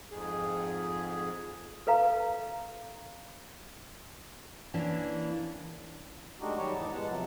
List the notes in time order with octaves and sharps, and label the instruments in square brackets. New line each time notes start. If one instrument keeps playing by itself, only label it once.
[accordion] F2 G#2 G#4
[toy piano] A4 B4 F5 A#5
[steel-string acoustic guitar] E3 A#3 C#4 D4
[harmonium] G#3 A3 D4 D#4 F#4 G4
D#3 F#3 G3 F#4 G4 C#5
E2 G#2 D#4 A5
G#3 B3 F#5 A5
C3 F3 F#3